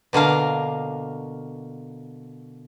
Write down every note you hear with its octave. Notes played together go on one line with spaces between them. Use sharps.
B2 D3 A#3 F5